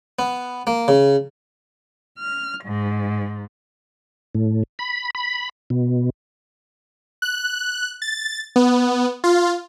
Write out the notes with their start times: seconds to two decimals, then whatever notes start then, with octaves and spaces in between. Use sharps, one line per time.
0.19 B3
0.67 A#3
0.88 C#3
2.18 F6
2.63 G#2
4.35 A2
4.79 B5
5.15 B5
5.70 B2
7.22 F#6
8.02 A6
8.56 B3
9.24 F4